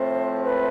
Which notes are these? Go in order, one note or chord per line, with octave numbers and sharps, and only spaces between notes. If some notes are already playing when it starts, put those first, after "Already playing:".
Already playing: A2 F3 A3 C4 C5
B4